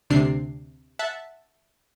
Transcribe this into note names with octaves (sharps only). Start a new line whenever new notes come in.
D2 C3 D4 C7
E5 F#5 A5